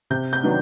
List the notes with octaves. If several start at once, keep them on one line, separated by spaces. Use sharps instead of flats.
C3 G6
G6
D#3 F#3 B3 D4